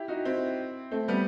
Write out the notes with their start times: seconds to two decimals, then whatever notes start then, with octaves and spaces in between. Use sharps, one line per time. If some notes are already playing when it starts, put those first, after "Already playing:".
Already playing: E4 G4
0.08 D#4 F#4
0.25 C4 E4
0.91 A3 C4
1.08 G3 B3